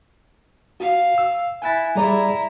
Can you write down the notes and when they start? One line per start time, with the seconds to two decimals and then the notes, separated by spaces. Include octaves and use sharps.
0.80 F#4 F5
1.18 E6
1.62 E4 G#5 F#6 A6
1.95 G3 E4 G#4 D5 A#5